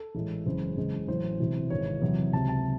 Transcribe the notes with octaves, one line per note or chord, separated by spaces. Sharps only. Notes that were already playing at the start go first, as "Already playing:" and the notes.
Already playing: A4
A1 A2 G#3
F#1 E2 C#3 G#3 C5
E2 C#3 G#3
A1 A2 F#3 C5
E1 E2 C3 E3
G#1 G#2 E3 G#3 C#5
E2 C3 F#3
C#2 C3 F#3 A5
A5